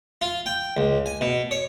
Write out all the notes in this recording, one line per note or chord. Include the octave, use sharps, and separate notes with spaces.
F4
G5
C#2
G#5
B2
C#5